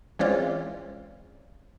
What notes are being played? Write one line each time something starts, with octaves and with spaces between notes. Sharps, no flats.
E3 G#3 C4 C#4 F4 D5